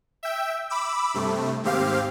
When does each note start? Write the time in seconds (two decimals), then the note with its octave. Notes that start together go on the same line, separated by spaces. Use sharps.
0.23 E5 G5
0.70 B5 D6 E6
1.14 G2 C3 A3
1.63 D#2 G#2 C4 G4 F5